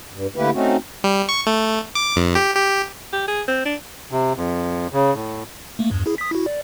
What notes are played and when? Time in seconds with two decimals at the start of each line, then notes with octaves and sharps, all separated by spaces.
0.12 G2
0.36 D3 A3 A#3 E4 G4 B4
0.54 A3 C4 C#4 D#4 F#4
1.04 G3
1.29 C#6
1.47 A3
1.95 D6
2.16 F2
2.35 G4
2.55 G4
3.13 G4
3.28 G#4
3.48 C4
3.65 D4
4.11 C3
4.37 F2
4.93 C#3
5.15 A2
5.79 A3 A#3
5.91 E2 G2
6.06 E4 G#4
6.18 D#6 B6
6.31 E4 F#4
6.46 D5